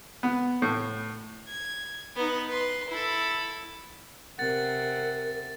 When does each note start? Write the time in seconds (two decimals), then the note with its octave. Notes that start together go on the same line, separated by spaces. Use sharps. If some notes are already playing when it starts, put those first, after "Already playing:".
0.23 B3
0.62 A2
1.48 G#6
2.16 B3 D#4
2.49 B4 C6
2.89 E4 A4
4.39 C3 A#4 F#5 A6